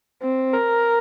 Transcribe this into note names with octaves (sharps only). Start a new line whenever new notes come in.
C4
A#4